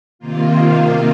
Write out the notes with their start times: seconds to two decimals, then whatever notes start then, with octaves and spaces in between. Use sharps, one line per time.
0.19 C3 D#3 A#3 F4